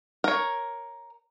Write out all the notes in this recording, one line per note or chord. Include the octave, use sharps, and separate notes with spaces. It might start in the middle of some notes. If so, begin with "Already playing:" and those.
A#4 C#5